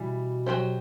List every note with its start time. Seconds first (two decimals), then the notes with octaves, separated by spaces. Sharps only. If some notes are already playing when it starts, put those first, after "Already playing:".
Already playing: B2 E3 G3
0.46 F#3 C4 G4 C5